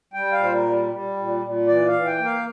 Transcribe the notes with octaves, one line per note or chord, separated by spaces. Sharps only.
G3 G5
F5
A#2 C5
A#4
G3
G3
A#2
A#2
E3 D5
F5
E3
G5
A#3
F5